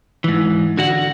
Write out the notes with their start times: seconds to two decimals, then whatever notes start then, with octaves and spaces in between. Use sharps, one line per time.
0.24 G#2 E3
0.77 D3 F#4 F#5